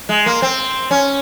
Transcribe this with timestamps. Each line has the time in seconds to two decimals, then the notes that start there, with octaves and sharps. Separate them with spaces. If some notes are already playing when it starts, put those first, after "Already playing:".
0.09 G#3
0.26 A#3
0.42 C4
0.91 C#4